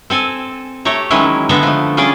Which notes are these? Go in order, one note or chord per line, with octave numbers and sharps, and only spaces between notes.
C4 A4 G#5
A3 G4 C#5 A#5
D#3 E3 F#3 G#3 C#4 E4
D3 G#3 B3 A4 E5 A#5
F3 A3
G3 C#4 F4 G#4 D5